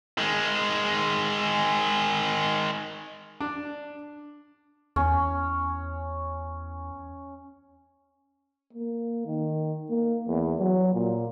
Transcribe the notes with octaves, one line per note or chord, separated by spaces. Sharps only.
D#3 G#3
D4
E2 C#4
A#3
D#3
A#3
E2
F#3
A#2